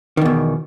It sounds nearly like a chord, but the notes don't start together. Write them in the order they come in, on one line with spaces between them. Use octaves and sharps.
D#3 E2 B2